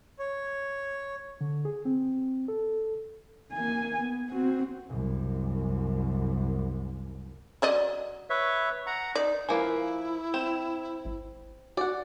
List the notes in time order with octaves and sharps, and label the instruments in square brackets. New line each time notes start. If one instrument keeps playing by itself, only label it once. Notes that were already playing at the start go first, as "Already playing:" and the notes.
[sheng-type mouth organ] C#5
[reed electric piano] D3
G#4
C4
A4
[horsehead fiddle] A#3 G#5
B3
C4 F#4
[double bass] C2 F#2
[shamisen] F#3 D5 D#5
[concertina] B4 C#5 E5
F#5 A#5
[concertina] D#4 [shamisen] D5
[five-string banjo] F3 A#3 B4 [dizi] E4 [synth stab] G#5
[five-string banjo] C4 [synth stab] E7
[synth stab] G#1
[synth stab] F#4 [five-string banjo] D5 F#5